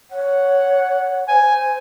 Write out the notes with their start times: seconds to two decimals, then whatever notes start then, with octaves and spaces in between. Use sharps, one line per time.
0.11 C#5 F#5
1.28 C5 G#5